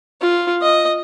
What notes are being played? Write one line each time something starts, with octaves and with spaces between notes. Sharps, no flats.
F4
D#5